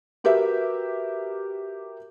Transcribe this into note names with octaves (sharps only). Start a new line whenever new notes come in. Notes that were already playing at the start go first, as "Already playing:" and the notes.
F#4 G4 A#4 B4 E5